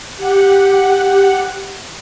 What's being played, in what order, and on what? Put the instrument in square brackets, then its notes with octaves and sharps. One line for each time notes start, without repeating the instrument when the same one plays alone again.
[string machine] G4 F#5